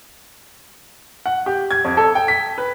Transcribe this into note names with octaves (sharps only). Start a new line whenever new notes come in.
F#5
G4
G#6
F2
A4
G5
B6
B4